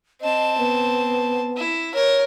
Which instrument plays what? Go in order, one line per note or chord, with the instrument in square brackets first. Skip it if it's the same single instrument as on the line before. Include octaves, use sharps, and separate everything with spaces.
[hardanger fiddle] C4 A5 [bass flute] D#5
[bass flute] B3
[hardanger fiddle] E4
[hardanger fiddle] A#4 [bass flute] C#5